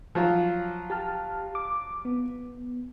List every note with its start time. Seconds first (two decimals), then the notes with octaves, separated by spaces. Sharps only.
0.15 F3 F#3 F4
0.90 G4 A5 F6
1.55 D6
2.05 B3